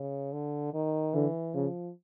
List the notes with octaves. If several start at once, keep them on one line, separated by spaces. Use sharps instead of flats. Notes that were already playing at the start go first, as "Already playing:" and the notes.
Already playing: C#3
D3
D#3
D3 E3
C#3 F3